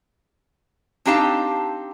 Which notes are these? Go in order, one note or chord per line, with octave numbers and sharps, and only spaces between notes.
C4 D4 D#4 G4 F5 A5